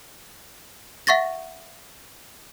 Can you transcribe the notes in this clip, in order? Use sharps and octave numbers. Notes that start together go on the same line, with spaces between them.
E5 F#5 C#6 A6 A#6